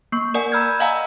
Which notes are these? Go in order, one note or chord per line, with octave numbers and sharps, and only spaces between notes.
A#3 C#6
A#4 D5 F#5 G#5
A#5 B5 E6 F6 G6 G#6
D#5 F5 F#5 G#5 A#5 E6